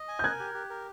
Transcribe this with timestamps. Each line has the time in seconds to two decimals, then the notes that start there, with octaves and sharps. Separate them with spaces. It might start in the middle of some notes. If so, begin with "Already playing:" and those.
Already playing: D#5
0.08 G#5
0.19 G6
0.24 A#4 F#6 G#6
0.40 G4
0.54 G4
0.70 A#4